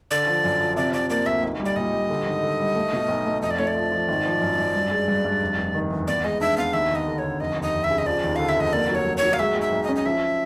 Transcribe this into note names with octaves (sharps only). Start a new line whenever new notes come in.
D3 D5
F3
F#2
F3
C3 D5
C3 D5
A#3 D5
D2 E5
B1
G3
D5
A#2 D#5
G3
D3
G#1
D3
G3
A3
B2
B1
A3
F2 D#5
D5
A3 C#5
D5
F3
F3
G#1
F3
F#2
F#2
G2
G#3
G2
G2
F1
F1
D#3
E2
B3 D5
G#3 D#5
D4 E5
B3 F5
D#2 E5
D#2 D#5
D3
C#5
D3
F1 D#5
D#2
D#5
F1
E5
C#3
D#5
F3 D5
D#2
D3 F5
E5
F1 D#5
A#3 D5
F#3
C#5
F#3
C#5
F#3
F5
G#3 E5
B1
E5
B1
D#5
C#4
D#5
F3 E5